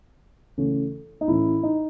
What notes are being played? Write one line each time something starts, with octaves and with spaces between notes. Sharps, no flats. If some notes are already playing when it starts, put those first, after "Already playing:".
C#3 E3 A3 C#4
D#4
A2 E3 A3 C#4 E4
D#4